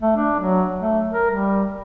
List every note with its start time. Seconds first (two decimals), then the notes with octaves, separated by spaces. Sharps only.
0.02 A3
0.16 D4
0.39 F#3
0.79 A3
1.12 A#4
1.30 G3